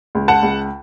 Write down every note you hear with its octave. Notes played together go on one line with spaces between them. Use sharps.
C#2
F#5 A5
C#2